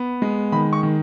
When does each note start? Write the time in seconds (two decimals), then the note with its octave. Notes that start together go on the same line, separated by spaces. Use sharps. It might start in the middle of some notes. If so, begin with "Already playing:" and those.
Already playing: B3
0.22 G#3
0.52 D#3 B5
0.73 C#6
0.83 D#3